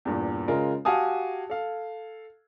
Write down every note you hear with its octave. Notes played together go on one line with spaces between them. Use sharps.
E2 G2 A#2
C#3 G#3 F4 A#4
F#4 G4 F5 G#5 A5 D#6
A4 F5